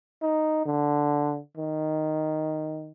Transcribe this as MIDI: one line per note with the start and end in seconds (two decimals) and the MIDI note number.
0.22 0.61 63
0.65 1.39 50
1.57 2.92 51